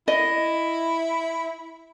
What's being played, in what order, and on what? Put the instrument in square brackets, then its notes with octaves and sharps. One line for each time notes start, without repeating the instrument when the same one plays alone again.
[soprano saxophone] E4 [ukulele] D#5